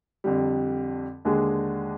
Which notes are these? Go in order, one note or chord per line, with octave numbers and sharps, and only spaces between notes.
F2 D3 G3
D#2 D3 G#3 D4 G#4